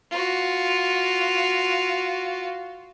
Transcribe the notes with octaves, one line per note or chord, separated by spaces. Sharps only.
F4 F#4